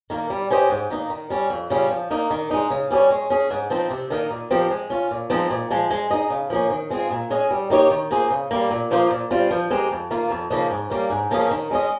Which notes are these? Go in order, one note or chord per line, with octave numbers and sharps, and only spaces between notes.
D#3 A#3
G3
C#4 G4 C5 D#5
G#2
D#3 A#3 D#4
D#3
G3 C#4
F2
C#3 G3 C#4 F4
F3
A#3 D#4
D#3
G#3 D#4
C#3
G3 C#4 G#4 C#5
G#3
C#4 G#4
G#2
F3 C4 D#4
C3
D#3 A#3 D#4 A#4
A#2
F3 C4 G4 A#4
G#3
C#4 F4
A#2
F3 G#3 C4 D#4
A#2
F3 G#3
G#3
D#4 G#4 D#5
C#3
F3 A#3 C#4
D#3
G#3 C4 F4 G#4
A#2
G#3 C#4 G#4 D#5
G3
A#3 D#4 G4 C#5
D#3
A#3 F4 G#4 C5
C#3
G3 A#3
A#2
F3 A#3 F4 C5
A#2
G3 C4 F4
F3
G#3 C4 G4 A#4
F2
D#3 A#3 F4
F2
C#3 F3 A#3 D#4
G#2
G3 A#3 C#4
G#2
F3 A#3 C#4 G#4
D#3
G#3 C#4 G#4 D#5